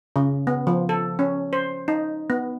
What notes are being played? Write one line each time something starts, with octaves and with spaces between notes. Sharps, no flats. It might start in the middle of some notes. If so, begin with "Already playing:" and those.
C#3
B3
F3
A4
C#4
C5
D#4
B3